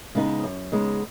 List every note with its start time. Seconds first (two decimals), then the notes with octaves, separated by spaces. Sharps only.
0.15 C#3 G#3 B3 D#4
0.43 F#2
0.72 C#3 G#3 B3 D#4